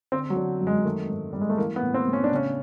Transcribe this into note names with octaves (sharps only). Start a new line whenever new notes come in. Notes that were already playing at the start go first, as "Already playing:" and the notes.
D3 C4
F#3
D3
F#2
G#3
D#3 A3
G#2
G#2 G3
G#3
A3
E3 A#3
B3
A2
C4
A2
C#4
D4
C#3 C#4